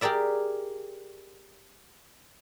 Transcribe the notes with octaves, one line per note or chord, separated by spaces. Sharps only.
G4 G#4 A#4 D5 E5